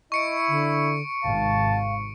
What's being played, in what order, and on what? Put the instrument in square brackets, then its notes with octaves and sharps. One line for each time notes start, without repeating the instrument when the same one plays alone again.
[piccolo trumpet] E4 [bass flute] D#5 [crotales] C#6 C#7 D7
[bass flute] D3
[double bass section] G#1 C3 [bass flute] F5 [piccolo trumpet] A5